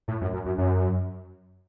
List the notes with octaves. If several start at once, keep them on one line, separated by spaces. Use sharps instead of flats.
A2
F#2
F#2
F#2
F#2